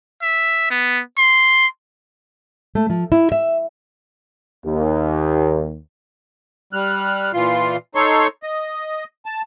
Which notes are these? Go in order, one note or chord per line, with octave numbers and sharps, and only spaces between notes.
E5
B3
C6
A3
F3
E4
E5
D#2
G3 F6 F#6
A#2 E3 F4 C6
D#4 A4 C#5 C6 C#6
D#5
A5